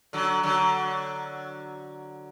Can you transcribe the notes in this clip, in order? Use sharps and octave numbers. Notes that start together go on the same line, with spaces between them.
D3 F#3
D3 F#3